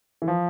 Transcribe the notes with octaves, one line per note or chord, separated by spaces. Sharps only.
E3
F3